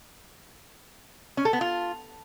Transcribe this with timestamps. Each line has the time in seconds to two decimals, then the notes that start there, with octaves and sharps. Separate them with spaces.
1.37 C#4
1.45 A4
1.53 B3
1.61 F4